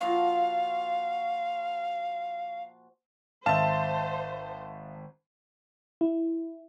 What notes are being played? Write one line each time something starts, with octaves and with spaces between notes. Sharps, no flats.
A#2 F3 F#4 F5
G#1 C5 E5 F5 A5
E4